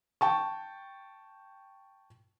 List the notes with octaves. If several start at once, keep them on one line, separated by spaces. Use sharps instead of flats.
G5 A5 C#6